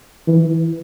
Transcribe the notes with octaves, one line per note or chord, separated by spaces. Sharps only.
E3